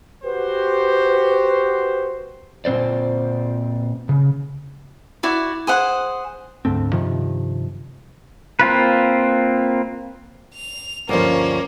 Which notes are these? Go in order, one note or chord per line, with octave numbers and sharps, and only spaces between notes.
F#4 G4 B4 C5
A#2 C4 C5 D5
C#3
E4 F#4 D5
G#4 C5 F#5
D2 G#2 A3 C4
G2 C3 D#3 F3
A#3 C4 F4 B4
F7
D2 G2 F3 A#3 C#4